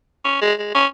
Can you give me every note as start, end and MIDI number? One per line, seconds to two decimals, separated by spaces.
0.25 0.40 61
0.41 0.53 56
0.59 0.71 56
0.74 0.86 61